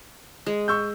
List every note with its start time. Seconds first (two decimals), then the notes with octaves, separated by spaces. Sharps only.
0.46 G#3
0.68 C#6 E6 G6